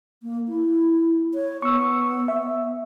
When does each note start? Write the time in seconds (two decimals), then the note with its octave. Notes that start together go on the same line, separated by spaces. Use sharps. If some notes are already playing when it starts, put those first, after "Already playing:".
0.23 A#3
0.48 E4
1.34 C#5
1.62 B3 C#6 E6
2.28 E5